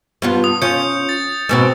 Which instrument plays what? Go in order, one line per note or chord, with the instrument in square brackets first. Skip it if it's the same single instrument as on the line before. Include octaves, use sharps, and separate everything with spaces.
[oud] G2 B3 F4
[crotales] D#6
[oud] C#4 F4 [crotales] G6 C#7
[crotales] A6
[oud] G#2 B2 C4